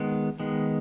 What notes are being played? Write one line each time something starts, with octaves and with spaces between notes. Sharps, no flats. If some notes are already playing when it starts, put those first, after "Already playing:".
Already playing: D#3 G#3 B3
D#3 G#3 B3